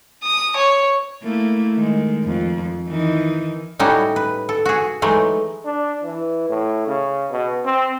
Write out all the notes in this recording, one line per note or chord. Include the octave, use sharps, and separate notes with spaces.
D#6
C#5
A3 A#3 E4
D#3 G#3
F2
D#3 E3 D#4
A2 G3 C#4 D#4 E4 F#4
B4
A4
F#4 G#4
E3 F#3 G#3 A3 D#4
D4
E3
A2
C#3
B2
C4